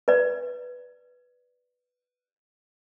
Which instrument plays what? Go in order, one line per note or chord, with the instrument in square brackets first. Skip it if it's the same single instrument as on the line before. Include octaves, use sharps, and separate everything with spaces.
[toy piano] B4 D5